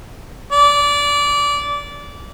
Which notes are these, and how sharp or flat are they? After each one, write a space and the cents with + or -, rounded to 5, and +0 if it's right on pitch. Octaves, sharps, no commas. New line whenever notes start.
D5 -20